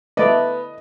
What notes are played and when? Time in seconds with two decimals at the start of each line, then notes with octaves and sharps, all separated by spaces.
0.17 A3 B3 B4 D5 D#5